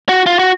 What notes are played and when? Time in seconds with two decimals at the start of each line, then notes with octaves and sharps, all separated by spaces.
0.09 F#4
0.26 F4
0.39 F#4